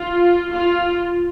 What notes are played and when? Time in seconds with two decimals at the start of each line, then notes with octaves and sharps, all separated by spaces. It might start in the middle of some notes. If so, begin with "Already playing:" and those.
Already playing: F4
0.55 F4